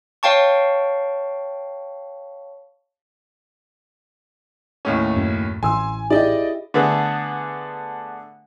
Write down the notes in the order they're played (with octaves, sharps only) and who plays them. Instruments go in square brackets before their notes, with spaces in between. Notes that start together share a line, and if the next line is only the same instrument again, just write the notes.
[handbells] C#5 F5 G5 A5 C#6
[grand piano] D#2 A2 C#4
[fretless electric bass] F#2
[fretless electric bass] A1 E3 [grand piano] G#5 [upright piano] C6 E6
[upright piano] E4 G4 G#4 [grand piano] D5 D#5 G5
[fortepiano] D3 A3 B3 G#4